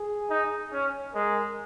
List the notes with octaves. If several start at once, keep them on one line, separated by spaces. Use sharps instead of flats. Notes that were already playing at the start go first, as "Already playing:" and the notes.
Already playing: G#4
D#4
C#4
G#3 A#4